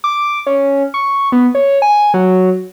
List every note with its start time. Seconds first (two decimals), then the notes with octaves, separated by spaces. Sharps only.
0.04 D6
0.47 C#4
0.94 C#6
1.32 B3
1.55 C#5
1.82 G#5
2.14 F#3